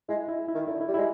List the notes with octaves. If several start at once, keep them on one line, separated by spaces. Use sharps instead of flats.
G#3 E4
E4
E4
D#3
D3 E4
E4
G3
G#3 E4